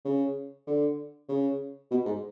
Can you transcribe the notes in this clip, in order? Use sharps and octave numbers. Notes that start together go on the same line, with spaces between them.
C#3
D3
C#3
B2
G#2